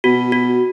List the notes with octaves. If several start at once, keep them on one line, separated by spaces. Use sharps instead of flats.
B2 F#4
F#4